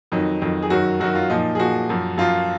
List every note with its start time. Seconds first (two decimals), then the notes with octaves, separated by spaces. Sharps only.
0.12 F2 D#3 F#3 D#4
0.41 F2 D#3 F#3
0.62 G#4
0.70 F#2 D#3 F#3 F#4
1.00 F#2 D#3 F#3 F#4
1.15 F4
1.30 A#2 F3 D#4
1.55 G#4
1.59 A#2 F3 F#4
1.89 F#2 F3
2.18 F#2 F3 F4